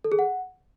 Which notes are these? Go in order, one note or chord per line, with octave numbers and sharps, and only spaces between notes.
A4
G#4
F#5